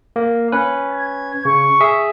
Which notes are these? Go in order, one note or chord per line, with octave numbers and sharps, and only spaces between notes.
A#3
C#4 B4
G#6
C#3 C#6
G#4 E5